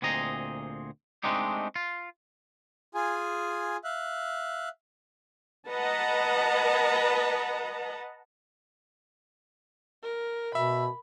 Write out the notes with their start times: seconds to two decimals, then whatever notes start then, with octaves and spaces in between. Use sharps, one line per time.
0.02 D2 A#2 C4 G#4 D#5 A#5
1.23 G#3 A3 C4 D4 D#4 G4
1.76 F4
2.95 F4 G#4 G#5
3.84 E5 F5 F#6
5.70 B4 D#5 F#5 A5 A#5
10.03 A#4
10.55 B2 E5 B5